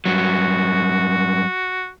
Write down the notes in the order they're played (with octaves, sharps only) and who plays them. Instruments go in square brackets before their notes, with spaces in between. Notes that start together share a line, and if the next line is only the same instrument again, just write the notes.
[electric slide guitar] G2 F#3 [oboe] F#4